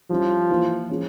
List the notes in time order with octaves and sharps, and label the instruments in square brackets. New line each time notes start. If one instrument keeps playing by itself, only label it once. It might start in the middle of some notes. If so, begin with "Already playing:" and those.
[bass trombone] F3 [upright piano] G3 C#4 E4
[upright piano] E3 A#3 E4
F3 G#3 C#4